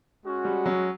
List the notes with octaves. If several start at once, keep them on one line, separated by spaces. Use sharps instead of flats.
G#3 C#4 F#4
G3
F#3